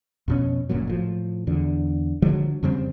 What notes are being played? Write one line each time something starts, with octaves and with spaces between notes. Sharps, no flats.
F2 B2 C#4
F#1 F#2 A#2 F#3
A2 F3
E2 D3
D3 F3 F#3 G#3
F2 C#3 G3 C4